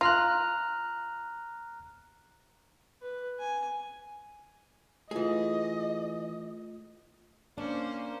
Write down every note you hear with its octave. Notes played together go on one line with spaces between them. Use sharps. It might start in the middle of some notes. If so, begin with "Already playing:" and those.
F4 A#5 F6 F#6
B4
G#5
E3 A3 F4 G#4 D#5
A#3 C#4 D4 C5